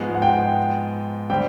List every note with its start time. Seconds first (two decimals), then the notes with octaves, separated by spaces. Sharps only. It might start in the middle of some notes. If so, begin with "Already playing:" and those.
Already playing: G#2 F3 G#3 B3
0.15 F#5
0.22 G5
1.30 D3 G3 C4 G5